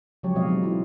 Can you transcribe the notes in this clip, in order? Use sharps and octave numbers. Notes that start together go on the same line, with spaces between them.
C#3 F3 F#3 G#3 G4 C#5
B2 F3 C4 D5 D#5 F5
F#3 D#4
E3 E4 F4